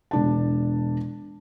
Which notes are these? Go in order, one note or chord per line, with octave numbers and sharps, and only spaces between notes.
E1 D4 A5